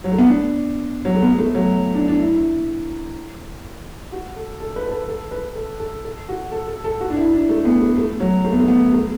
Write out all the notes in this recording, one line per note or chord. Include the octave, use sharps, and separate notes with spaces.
F#3
A3
B3
D4
F#3
A3
B3
A3
F#3
D4
D4
E4
F#4
A4
A4
A4
B4
B4
A4
A4
B4
A4
A4
A4
F#4
A4
A4
A4
F#4
D4
E4
D4
A3
B3
A3
A3
F#3
A3
B3
A3
B3
A3